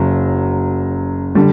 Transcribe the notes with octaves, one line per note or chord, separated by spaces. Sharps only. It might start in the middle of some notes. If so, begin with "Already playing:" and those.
Already playing: F#1 F#3
D3 G3